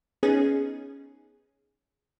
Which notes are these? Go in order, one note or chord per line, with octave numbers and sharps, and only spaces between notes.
B3 C#4 D#4 G#4